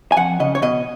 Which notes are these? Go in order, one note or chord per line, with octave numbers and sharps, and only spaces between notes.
G#5
F2 F#5
C#3 D#5
C#5
B2 D#5